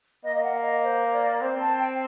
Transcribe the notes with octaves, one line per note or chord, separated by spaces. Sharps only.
A#3 D#5
D#5
F#5
D#5
C5
D5
C4 C5
A5
G5